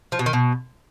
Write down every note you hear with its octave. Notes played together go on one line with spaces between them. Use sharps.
F3
B2
D#3
B2